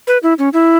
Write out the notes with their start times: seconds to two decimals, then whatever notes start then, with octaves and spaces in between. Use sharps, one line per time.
0.07 B4
0.23 E4
0.39 C#4
0.53 E4